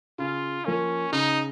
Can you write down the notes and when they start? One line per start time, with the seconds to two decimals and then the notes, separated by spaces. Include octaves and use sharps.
0.19 C#3 F4
0.65 F3 A#3 C#4
1.12 C#3 D#4